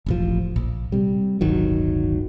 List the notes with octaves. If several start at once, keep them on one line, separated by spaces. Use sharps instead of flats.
E1 A1 F3
A#1
C3 G3
D1 G1 D#3 F#3